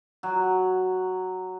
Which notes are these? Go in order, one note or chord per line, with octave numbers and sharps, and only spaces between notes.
F#3